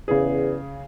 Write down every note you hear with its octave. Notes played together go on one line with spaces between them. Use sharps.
E2 C#3 G#4